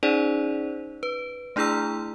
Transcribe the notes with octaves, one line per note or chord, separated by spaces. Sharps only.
C#4 D#4 G#4 C5 D5
B4
A3 D4 E4 G#4 A#5 E6